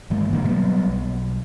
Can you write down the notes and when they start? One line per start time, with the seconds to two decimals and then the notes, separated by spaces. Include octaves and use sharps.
0.10 G#2 E3 G#3 A#3
0.33 G2 B2 D3 A#3
0.48 F#3 G3 B3
0.86 B1